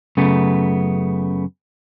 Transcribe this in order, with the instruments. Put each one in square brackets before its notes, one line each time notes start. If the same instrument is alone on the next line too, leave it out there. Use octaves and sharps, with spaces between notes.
[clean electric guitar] F#2 C#3 A3 B3